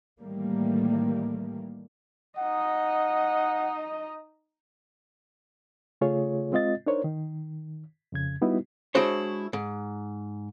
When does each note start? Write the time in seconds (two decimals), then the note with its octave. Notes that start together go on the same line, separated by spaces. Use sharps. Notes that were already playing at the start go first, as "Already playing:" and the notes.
0.21 A2 D#3 E3 G3 A3 A#3
2.39 D#4 D#5 F#5
6.01 C#3 A3 F4 G#4 C#5
6.52 G#3 C4 F4 D#5 A6
6.87 D4 D#4 A#4 C5 C#5
7.04 D#3
8.12 F2 C#3 G#6
8.42 G3 B3 D#4 E4 F#4
8.95 G#3 D4 E4 F#4 C5 C#5
9.53 G#2